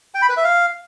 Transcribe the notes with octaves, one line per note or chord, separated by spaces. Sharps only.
G5
B5
B4
E5
F5